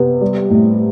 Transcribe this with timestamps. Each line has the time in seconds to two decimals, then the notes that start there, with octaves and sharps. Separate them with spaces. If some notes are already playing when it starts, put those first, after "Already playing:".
Already playing: C3 B3
0.21 G3
0.50 A2